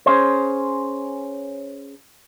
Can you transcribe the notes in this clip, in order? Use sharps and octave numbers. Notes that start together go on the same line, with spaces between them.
C#4 G#4 C5